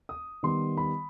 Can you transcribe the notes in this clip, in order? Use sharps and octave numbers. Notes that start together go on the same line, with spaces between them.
D#6
D#3 G3 B3 C6
B5